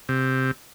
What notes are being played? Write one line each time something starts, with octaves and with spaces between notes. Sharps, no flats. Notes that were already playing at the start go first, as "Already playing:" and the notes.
C3